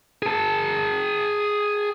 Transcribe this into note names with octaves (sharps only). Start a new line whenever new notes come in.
G#4 A5